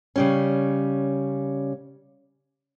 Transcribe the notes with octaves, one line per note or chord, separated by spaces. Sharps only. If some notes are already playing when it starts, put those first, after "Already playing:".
C#3 G3 C#4